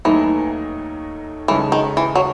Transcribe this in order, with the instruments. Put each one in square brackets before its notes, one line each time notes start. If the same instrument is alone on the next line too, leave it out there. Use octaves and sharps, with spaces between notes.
[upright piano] D#2 D#3 F#3 A3 D#4 [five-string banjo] E3
[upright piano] C#3 G#3 D#4 A4 C#5 [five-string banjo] E3
[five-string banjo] D#3
E3
F#3